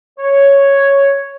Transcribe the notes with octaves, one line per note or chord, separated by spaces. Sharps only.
C#5